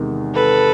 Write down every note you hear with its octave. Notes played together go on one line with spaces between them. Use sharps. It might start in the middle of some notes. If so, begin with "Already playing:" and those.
Already playing: E2 C3 D#3 G#3
A4 B4